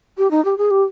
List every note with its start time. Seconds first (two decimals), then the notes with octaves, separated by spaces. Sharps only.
0.18 G4
0.31 D#4
0.45 G4
0.58 G#4
0.71 G4